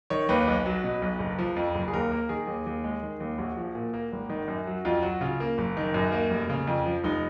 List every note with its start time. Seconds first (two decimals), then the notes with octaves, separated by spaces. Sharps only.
0.10 D#3 C#5
0.29 D#2 B4
0.47 B1
0.66 F#3
0.84 B2
1.02 B1
1.19 F#1
1.38 F3
1.56 F2
1.75 F#1
1.88 G#4
1.94 D#2 A#4
2.12 A#3
2.29 D#3 G#4
2.47 D#2
2.66 D#2
2.84 G#3
3.03 D#3
3.20 D#2
3.38 A#1 F#4
3.57 F3
3.75 A#2
3.94 A#3
4.13 G#1
4.30 D#3
4.48 F#2
4.67 F#3
4.85 F2 F4
5.03 F#3 F#4
5.21 C#3 F4
5.40 A#3
5.58 F#1
5.77 D#3
5.94 F#2
6.12 A#3
6.30 F1
6.50 C#3
6.67 F2
6.86 F3
7.04 F1 D#4